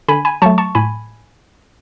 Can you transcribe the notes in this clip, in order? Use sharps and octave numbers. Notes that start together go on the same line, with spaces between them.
D3 G#5 B5
G#5 B5
F#3 A3 A5 C#6
A5 C#6
A2 G#5 B5